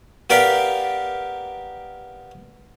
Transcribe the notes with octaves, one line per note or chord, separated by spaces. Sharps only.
B3 G4 A#4 D5 F5 G5